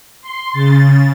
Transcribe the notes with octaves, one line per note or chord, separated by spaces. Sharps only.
C6
C#3 A6